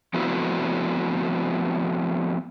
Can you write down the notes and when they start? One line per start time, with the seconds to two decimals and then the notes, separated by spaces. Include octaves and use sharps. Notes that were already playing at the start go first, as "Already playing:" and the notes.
0.14 F3 A3 B3 C4 E4 F#4